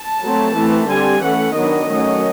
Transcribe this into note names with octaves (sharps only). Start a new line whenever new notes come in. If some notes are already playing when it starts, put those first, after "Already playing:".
Already playing: A5
F#3 A3 C4
E3 A3 C4
D3 G3 C4 G#5
E3 A3 C#4 F#5
D#3 F#3 B3 D4 D#5
D#3 F#3 A3 C#4